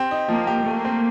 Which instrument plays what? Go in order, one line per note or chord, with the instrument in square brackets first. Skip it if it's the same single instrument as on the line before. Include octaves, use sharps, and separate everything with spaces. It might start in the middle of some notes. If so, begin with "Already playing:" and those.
Already playing: [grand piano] C4 G4
D#4
[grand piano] F3 [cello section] A#3
[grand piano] G4
[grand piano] A3 [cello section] A#3
[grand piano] C4